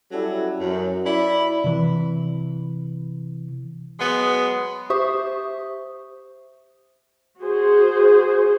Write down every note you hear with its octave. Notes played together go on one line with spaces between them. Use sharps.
F#3 G3 C#4 E4 F#4 A4
F#2
E4 D5 B5
C3 E3
F#3 G#3 B3
G4 C5 E5 C#6 D#6
F#4 G#4 C5